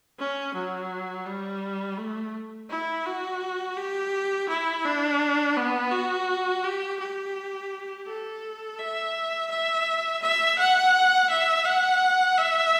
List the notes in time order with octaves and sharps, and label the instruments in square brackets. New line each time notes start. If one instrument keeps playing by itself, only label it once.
[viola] C#4
F#3
G3
A3
E4
F#4
G4
E4
D4
B3
F#4
G4
G4
A4
E5
E5
E5
F#5
E5
F#5
E5